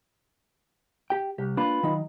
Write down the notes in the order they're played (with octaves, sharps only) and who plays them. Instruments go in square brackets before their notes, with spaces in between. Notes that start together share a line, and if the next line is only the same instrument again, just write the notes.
[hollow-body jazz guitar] G4 G5
[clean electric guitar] C2 [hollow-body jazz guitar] G4
[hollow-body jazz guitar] A#3 D4 [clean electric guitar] F4 B4
[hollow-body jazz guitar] D#3 F#3 D#4